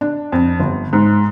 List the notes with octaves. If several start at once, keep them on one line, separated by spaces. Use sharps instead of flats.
D4
F2
G1
G#2